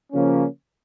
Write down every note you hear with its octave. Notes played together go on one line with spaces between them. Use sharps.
C#3 F3 A#3 C#4